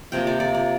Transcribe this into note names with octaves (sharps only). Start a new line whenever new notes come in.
C3 F3 A#3 G5
D5
D5
D5